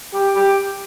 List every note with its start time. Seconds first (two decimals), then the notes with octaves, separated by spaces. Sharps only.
0.14 G4
0.36 G4